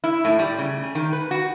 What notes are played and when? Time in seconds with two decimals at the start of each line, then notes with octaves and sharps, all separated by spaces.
0.04 E4
0.25 A2
0.39 G3
0.58 C#3
0.83 G#4
0.95 D#3
1.13 B4
1.31 F#4